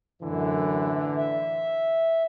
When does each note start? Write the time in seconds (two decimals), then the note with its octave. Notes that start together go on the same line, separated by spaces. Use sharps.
0.22 F#2 A2 D3 E3
1.17 E5